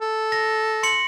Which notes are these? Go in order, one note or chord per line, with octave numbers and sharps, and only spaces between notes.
A4
A#6
C6 C#7 F#7